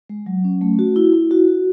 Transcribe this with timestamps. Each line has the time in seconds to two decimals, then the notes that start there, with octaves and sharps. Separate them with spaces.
0.10 G#3
0.26 F#3
0.44 C#4
0.61 A3
0.79 F#4
0.96 E4
1.13 E4
1.31 F#4
1.48 F#4